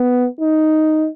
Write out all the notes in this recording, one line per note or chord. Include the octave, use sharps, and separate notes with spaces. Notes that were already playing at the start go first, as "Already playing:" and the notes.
Already playing: B3
D#4